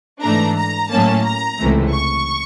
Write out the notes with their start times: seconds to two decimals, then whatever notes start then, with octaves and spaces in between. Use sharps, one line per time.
0.22 G#2 E3 A3 D4 A#5
0.57 A#5
0.90 A2 F#3 A#3 C#4 A5
1.25 A#5
1.59 C#2 C3 E3 A3
1.92 C#6